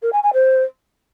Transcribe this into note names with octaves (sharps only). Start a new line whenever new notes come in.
A#4
G#5
G#5
C5